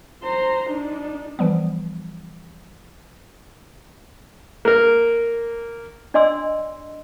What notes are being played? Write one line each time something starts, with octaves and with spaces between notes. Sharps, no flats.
C5 A#5
D4 D#4
E3 F3 G3 B3
A#3 A#4
D4 D5 D#5 G#5 C6 E6